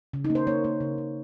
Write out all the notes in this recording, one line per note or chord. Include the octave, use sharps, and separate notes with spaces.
C#3
D#4
A#3
C5
A#3 C#5
A#3
C#3
C#3